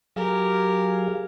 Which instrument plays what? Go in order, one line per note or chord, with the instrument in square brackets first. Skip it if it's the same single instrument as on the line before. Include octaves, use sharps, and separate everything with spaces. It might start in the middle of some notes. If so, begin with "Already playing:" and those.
[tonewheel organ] F#3 G#4 F5 [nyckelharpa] G4 A#4